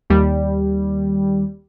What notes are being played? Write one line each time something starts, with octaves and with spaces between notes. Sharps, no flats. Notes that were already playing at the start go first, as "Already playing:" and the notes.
D#2 G3